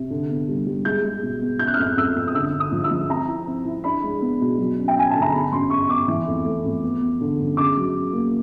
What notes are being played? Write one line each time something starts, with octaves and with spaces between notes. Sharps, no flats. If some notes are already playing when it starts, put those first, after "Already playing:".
Already playing: C3
D3
B3
G3
G3
G#3 G6
G#3
B2
B3
C#3 G6
F#6
F6
F2 F#6
F2 E6
F2
D#6
D3 E6
D3
D#6
F3
E6
F3
C4 A#5
E4
C4
E4
D4 B5
G#3
B3
B2
F#3
C#4
G5
C#4 G#5
D3 A5
A#5
B3 B5
F#2 C6
B3 C#6
B3 D6
E3
F2
A3
F2
B3
B3
D3
F#2
C#3 D6
F#3
C#3
A#3